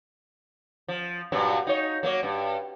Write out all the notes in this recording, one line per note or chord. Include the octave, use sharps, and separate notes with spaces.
F3
G2 A#2 F#3
D#4 C#5
F#3 A#3 C#5
G2